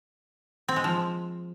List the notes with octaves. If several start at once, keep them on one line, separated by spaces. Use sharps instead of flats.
C4
G#3
F3